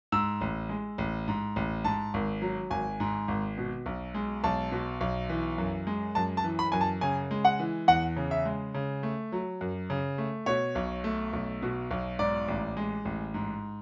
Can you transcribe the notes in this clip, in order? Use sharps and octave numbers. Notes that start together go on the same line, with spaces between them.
G#2 E6
A1
G#3
A1
G#2
A1
G#2 A5
G#1
F#3
G#1 G#5
G#2
G#1
B2
B1
G#3
B1 A5
B2
B1
E3
F#2
G#3
F#2 A5
A5
E3
B5
F#2 G#5
A5
C#3 G#5
G#3
F#5
E3
E2 F#5
C#3
E5
G#3
C#3
A3
F#3
F#2
C#3
A3
B2 C#5
B1
A3
B1
B2
B1
G#2 D5
A1
G#3
A1
G#2